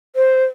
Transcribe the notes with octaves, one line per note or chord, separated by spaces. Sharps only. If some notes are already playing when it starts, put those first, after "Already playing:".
C5